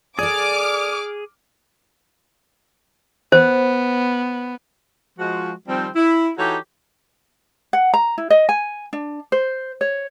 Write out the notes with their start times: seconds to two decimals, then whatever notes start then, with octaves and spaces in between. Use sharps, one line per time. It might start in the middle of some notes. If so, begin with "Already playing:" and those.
0.19 G#4 A4 D5 D6 F6
3.32 B3 C5
5.19 F3 G#3 F#4
5.68 D#3 F3 G3 C4
5.95 E4
6.38 E3 D#4 F#4 G4 A4 C#5
7.73 F#5
7.94 A#5
8.18 E4
8.30 D#5
8.49 G#5
8.93 D4
9.32 C5
9.81 C#5